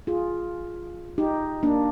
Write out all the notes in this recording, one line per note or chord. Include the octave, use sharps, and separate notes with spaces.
F4 G#4
D#4 G4
A#3 D4